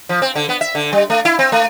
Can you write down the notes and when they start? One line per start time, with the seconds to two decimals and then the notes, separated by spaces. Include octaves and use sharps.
0.09 F3
0.22 C4
0.36 D3
0.49 B3
0.61 E5
0.75 D3
0.93 G3
1.10 A3
1.25 E4
1.39 C4
1.52 A3